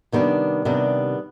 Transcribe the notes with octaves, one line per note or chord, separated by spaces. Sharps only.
C3 D#3 G3 B3 D4
C3 D#3 G3 B3 D4